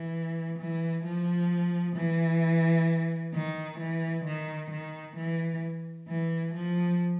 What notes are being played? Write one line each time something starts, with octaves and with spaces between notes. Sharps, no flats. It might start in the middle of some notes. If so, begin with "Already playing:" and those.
Already playing: E3
E3
F3
E3
D#3
E3
D#3
D#3
E3
E3
F3